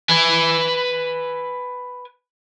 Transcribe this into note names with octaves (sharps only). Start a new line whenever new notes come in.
B4 G#5